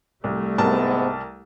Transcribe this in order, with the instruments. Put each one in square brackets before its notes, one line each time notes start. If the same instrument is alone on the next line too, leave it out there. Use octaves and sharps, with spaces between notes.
[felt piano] C2 [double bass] G3 A3
[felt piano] C2 A#4 A5 [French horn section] G#2 C3 B3